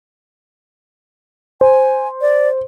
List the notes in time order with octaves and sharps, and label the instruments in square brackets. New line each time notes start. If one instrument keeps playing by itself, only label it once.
[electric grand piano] C5 [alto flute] G#5
[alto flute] D5